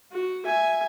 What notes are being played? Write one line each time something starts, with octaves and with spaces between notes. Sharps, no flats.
F#4
E5 G#5